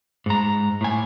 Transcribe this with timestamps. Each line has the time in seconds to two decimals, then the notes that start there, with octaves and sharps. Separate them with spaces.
0.26 G#2 A#5
0.81 A2 G#5